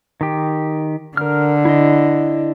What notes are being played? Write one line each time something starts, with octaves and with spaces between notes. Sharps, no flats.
D#3 G4
D3 A#4 F6
E4 D#5